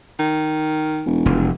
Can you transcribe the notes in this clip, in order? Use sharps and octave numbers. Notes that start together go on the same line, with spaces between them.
D#3
E1
F1